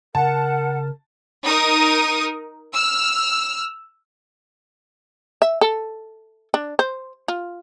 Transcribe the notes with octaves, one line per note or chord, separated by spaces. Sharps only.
C#3 A#4 F#5 A5
D#4 A#4 D#6
E6 F6
E5
A4
D4
C5
F4